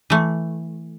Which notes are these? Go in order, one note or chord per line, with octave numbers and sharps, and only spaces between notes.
E3 A3